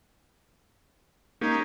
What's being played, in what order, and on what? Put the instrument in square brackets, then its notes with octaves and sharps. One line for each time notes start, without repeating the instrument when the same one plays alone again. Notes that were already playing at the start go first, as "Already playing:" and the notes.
[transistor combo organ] G#3 C#4 G4 [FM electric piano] A#3 [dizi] D#4